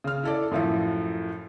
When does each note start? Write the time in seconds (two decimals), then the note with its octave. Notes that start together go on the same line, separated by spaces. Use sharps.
0.04 C#3 F6
0.23 E4 A4 D5
0.51 F#2 A2 F3 E4